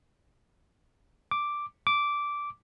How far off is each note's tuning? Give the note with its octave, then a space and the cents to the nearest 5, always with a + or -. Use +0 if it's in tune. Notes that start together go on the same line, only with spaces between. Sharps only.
D6 +0
D6 -10